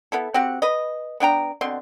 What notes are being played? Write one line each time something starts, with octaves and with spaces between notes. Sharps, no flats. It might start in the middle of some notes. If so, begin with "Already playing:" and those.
B3 E4 A4
C4 F#4 G4 F#5
B4 D#5
B3 D4 G5 A#5
B2 D3 C4 C6